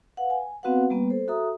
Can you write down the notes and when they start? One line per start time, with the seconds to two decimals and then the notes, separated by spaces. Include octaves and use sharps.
0.17 B4 F5 F#5
0.30 G#5
0.63 B3 C4 F#4 B4 F5 F#5
0.90 G3 A#3 B3 B4
1.10 A4 C5
1.28 F#4 A4 E5 A#5 D#6